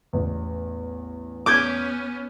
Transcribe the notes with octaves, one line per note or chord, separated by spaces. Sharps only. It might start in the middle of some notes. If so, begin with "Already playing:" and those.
A1 E2
B3 C#4 D6 G6 G#6